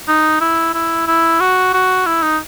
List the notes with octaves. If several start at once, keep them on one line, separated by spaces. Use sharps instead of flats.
D#4
E4
E4
E4
F#4
F#4
E4
D#4